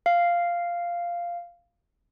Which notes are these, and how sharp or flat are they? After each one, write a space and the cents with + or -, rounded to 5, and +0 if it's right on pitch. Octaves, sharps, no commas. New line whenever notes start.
F5 -5